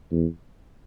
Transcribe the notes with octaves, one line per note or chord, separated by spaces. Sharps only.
E2